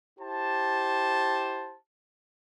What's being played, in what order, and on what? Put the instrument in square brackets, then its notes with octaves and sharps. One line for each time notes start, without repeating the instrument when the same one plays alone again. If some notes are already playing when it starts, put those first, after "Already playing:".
[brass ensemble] E4 G4 C5 A5